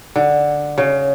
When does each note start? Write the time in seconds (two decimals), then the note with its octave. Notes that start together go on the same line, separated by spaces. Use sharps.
0.16 D3
0.78 C#3